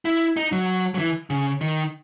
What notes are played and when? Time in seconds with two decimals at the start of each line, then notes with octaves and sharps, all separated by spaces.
0.05 E4
0.37 D#4
0.52 F#3
0.94 F#3
0.99 E3
1.30 C#3
1.61 D#3